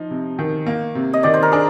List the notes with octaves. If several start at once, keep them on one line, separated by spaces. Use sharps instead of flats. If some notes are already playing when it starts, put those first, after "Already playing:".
Already playing: F3 D#4
C3
D#3
A#3
C3
D#5
D#3 D5
C5
A#4
D4 G#4